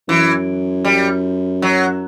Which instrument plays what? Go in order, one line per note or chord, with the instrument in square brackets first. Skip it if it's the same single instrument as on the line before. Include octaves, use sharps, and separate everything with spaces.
[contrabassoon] F#2 [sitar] E3
[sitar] G3
F#3